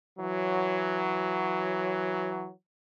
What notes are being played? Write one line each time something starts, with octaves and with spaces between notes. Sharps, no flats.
E3 F#3